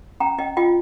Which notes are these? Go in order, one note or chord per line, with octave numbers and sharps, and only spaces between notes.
C#4 G5 A#5
C#4 D#5 G5
F4 D#5 G5